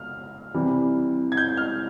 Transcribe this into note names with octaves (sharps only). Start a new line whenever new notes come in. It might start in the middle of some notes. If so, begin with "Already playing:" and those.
Already playing: F6
C3 E3 G3
G#6
G6
F6